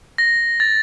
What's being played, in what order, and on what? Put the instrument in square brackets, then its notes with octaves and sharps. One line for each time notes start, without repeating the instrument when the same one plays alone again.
[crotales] A#6
A6